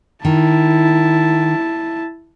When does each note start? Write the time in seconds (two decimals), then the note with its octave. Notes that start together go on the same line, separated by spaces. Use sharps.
0.25 D#3 E4 A5